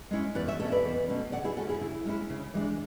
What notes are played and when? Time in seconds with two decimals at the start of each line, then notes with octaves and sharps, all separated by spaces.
0.11 G#3 C#4 E4
0.35 E2 B4 D5
0.48 C#5 E5
0.60 B2 A3 C#4 A4 C#5
0.72 B4 D5
0.85 E2
1.08 B2 A3 C#4
1.32 C#3 D5 F#5
1.44 E4 G#4
1.57 G#3 C#4 E4 F#4 A4
1.69 E4 G#4
1.81 C#3 E4
2.05 G#3 C#4 E4
2.30 C#3
2.54 E3 G#3 D4